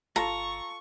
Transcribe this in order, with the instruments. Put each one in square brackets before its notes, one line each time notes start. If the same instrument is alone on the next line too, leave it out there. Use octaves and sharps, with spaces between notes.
[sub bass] G1 [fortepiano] F4 A4 [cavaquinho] A#5 [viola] C#6